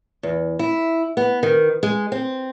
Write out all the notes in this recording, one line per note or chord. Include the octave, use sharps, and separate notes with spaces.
E2
E4
B3
D#3
G#3
C4